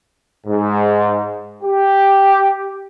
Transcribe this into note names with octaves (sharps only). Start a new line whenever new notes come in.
G#2
G4